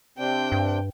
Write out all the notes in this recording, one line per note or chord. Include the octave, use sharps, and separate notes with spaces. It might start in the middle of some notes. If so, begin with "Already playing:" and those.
C3 C4 D4 G5
G2